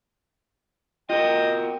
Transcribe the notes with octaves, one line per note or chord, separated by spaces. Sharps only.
F4 F#4 A#4 D#5 G5